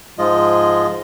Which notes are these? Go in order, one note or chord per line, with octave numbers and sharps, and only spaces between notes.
G#2 F3 G#3 F4 D#5